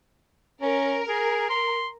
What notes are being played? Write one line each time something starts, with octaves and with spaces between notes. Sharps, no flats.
C#4 A#4
G#4
C6